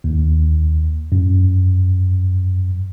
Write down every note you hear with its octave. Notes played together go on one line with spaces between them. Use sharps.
D#2
F#2